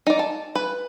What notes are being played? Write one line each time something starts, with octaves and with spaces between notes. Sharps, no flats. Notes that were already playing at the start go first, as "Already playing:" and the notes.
D#4 D5
A5
B4